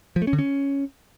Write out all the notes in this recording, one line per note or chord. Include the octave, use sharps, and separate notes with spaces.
F3
A3
C#4
D3
C#4